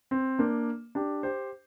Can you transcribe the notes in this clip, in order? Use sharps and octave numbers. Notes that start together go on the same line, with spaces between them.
C4
A#3 D4
D4 G4
G4 C5